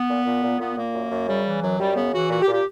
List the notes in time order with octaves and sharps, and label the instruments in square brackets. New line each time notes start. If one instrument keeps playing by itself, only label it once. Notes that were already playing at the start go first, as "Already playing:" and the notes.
Already playing: [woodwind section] B3
A#2
A#2
A#2
A#2 B3
A#2 A#3
F#2
F#2
C#3 G3
E3
F#2 F#3
F#2 G3
C#3 B3
E3 F#4
A#2 F#4
G4
A#2
G4